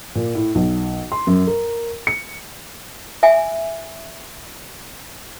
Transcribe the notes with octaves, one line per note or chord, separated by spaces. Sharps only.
A#2
A2
B1
C6
F#2
A#4
C#7
E5 G#5